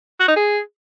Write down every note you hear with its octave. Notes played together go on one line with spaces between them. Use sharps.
F#4
D#4
G#4